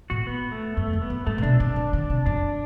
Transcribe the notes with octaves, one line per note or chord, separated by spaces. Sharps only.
A2 F#4
B3
A3
F#2 A3
E2
B3
F#2
G2 A3
C3
B2 D4
C3 D4
D3
D3
C3
F#2 D4